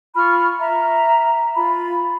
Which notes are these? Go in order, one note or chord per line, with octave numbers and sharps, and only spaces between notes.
F4 B5 C#6 F6
E5 A#5
F4 B5